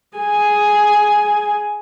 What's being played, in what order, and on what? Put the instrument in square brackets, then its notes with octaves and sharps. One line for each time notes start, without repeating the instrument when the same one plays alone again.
[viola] G#4 G#5